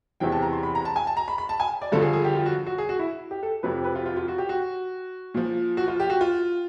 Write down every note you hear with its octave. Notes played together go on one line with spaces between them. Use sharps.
E2 C3 E3 G5
A5
A#5
C6
B5
A#5
A5
G#5
A5
A#5
B5
B5
A5
G#5
D5
G2 D3 F3 A4
G#4
G#4
G4
F4
F#4
F#4
G#4
F#4
E4
G4
A4
F2 C3 F3 B4
B4
F4
F4
F4
F#4
G4
F#4
A#2 F3
F#4
F4
G4
F#4
F4